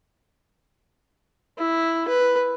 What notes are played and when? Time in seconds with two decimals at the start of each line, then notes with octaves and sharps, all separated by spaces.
1.58 E4
2.08 B4